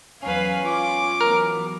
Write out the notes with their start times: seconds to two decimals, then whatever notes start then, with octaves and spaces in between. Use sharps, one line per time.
0.23 E2 F#3 C#4 B4 F5 G#5
0.65 F4 D6
1.21 E3 F#3 B3 A#4